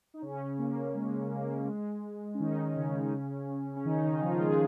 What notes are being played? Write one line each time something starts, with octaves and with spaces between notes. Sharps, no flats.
D#4
C#3 C#4
A#3
G#3
A#3
G#3
C#4
D#3 D#4
C#3 C#4
C#4
D#3 D#4
D#3 D#4
D#4
F3 F4
G#3 G#4